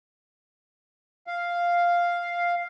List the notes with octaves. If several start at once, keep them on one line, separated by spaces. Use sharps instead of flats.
F5